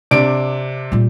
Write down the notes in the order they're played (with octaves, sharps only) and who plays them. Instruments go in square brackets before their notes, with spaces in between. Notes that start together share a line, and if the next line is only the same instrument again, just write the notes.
[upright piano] C3 D4 D7
[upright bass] A#2 G3